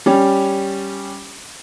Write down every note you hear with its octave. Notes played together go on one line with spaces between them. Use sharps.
G3 C#4